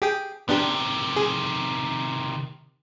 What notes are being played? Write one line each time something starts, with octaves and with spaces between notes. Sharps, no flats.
G4 G#4 G5
C3 D#3 B3 D4 G4
G#4